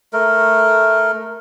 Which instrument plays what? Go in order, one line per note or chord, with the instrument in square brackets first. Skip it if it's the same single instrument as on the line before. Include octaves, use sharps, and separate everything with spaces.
[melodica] A3 A#4